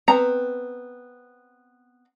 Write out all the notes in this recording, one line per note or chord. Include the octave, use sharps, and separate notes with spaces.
B3 C4 A#5